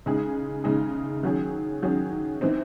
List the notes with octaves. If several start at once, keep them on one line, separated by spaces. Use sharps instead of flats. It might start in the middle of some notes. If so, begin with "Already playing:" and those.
C#3 G#3 D#4 G#4
C#3 G#3 D#4 G#4
D#3 F#3 C#4 G#4
D#3 F#3 C#4 G#4
E3 C4 D#4